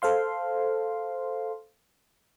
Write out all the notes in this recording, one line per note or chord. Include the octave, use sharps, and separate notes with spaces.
A4 C5 F5 C6